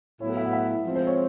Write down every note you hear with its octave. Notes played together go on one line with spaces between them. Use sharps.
A2 F#3 B3 E4 C#5
B4
E5
F#5
E5
F3 G#3 C4
C5
C#5